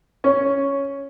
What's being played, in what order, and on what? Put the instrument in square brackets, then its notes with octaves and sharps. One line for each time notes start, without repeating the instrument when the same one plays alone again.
[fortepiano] C#4